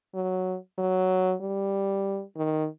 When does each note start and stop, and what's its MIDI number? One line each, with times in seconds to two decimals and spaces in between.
0.15 0.57 54
0.78 1.34 54
1.41 2.22 55
2.37 2.67 51